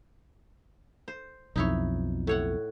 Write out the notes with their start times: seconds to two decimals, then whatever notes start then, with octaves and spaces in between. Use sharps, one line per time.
1.08 C5
1.56 B1 F2 D#4 E4 C#5
2.27 A2 C#5 F#5